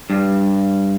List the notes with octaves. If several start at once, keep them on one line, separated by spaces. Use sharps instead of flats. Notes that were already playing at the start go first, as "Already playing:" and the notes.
G2